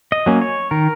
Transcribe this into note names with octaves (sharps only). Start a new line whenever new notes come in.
D#5
F#3 A#3 C#4
C#5
D#3 A#4